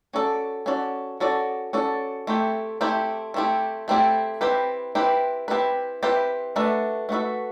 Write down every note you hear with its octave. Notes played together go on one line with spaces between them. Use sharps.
C#4 F#4 A4 D5
C#4 F#4 A4 D5
C#4 F#4 A4 D5
C#4 F#4 A4 D5
A3 C4 E4 G4
A3 C4 E4 G4
A3 C4 E4 G4
A3 C4 E4 G4
C4 E4 G4 B4
C4 E4 G4 B4
C4 E4 G4 B4
C4 E4 G4 B4
A3 D4 F#4 B4 E5
A3 D4 F#4 B4 E5